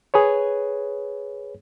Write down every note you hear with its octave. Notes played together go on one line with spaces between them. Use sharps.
G#4 B4 C#5